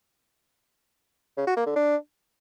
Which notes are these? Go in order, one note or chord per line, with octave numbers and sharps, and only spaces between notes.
C#3
F#4
A#3
D3
D4